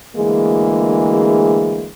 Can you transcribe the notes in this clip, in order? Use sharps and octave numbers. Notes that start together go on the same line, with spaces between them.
D2 E3 G#3 A#3 G#4